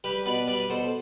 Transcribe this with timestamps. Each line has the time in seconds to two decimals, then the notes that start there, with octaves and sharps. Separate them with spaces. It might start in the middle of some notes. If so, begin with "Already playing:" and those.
0.04 G3 G4 B4
0.26 B2 B4 D5
0.47 G3 B4 D5
0.70 B2 A4 C5